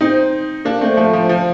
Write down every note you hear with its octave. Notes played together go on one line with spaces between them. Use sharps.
C4 D#4
A#3 D4
A3 C4
F3 A3
F3
F3